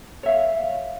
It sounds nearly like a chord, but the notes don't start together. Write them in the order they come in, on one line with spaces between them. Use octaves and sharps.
C#5 E5 F5